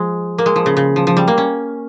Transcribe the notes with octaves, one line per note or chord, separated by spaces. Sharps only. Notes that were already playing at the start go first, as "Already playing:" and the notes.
Already playing: F3 G#3
A#3
G#3
F3
C#3
C#3
F3
F3
G3
A#3
C#4